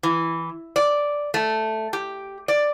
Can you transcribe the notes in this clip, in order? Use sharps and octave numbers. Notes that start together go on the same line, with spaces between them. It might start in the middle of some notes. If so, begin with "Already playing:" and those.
E3
D5
A3
G4
D5